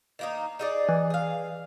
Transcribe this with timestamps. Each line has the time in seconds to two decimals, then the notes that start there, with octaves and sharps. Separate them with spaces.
0.19 D#3 A#3 D#4
0.59 D#4 G#4 D5
0.89 E3
1.10 G#4 F5